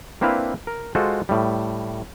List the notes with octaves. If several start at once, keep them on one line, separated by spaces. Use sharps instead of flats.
A#3 C4 D4 E4 B4 F5
A#4
G#3 F4 F#4 A4 C5
A2 G3